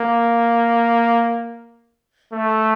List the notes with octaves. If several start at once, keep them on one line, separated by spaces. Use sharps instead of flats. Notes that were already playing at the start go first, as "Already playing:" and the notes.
Already playing: A#3
A3